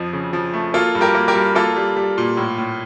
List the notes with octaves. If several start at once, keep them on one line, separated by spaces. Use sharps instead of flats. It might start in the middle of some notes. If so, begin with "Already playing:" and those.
Already playing: F2 F3
C#3
F3
A3
A#3 F4 A4
G2
G4 A#4
A#3
G4 A#4
G2
A#3 F4 A4
G3
G3
A#2
A2
A2